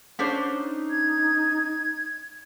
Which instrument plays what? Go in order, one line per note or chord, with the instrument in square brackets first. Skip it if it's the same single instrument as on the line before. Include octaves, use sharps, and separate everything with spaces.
[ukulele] C#4 D4 C5
[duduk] D#4
[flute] G#6